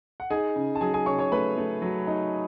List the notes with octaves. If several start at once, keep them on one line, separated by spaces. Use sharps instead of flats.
F#5
D#4 G#4 G#5
C#3
A5
F#3 G#4 G#5
G#4 G#5
C#3 C#5 C#6
C#5 C#6
A3 B4 B5
A3
F#3
D#4